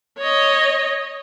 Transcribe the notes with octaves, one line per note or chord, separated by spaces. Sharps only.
C#5 D#5